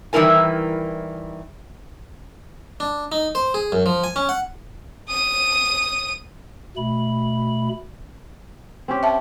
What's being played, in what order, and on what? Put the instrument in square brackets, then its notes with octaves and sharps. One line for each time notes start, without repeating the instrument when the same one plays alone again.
[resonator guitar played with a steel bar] D#3 E3 G3 E4 A#4 G#5
[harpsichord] D4
D#4
C5
G#4
F#2
F3
G#5
C#4
F#5
[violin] D#6 D#7
[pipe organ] B2 A3 B5
[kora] C4 C#4 G4
[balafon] E5 A5